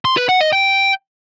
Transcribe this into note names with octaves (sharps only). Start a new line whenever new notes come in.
C6
B4
F#5
D#5
G5